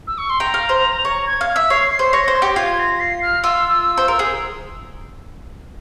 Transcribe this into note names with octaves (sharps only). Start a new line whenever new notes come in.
E6
C#6
C6
G5 A#5
F5
C5
C#5
G#6
F5
E5
C#5 C7
C7
C5
C#5 A#6
C5
C6
G4 G6
F4 G#6
A#6
C7
F6
F4 E6
C5
A#4
G#4 E6